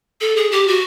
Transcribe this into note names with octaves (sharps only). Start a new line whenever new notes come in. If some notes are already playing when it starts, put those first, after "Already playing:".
A4
G#4
G4
F#4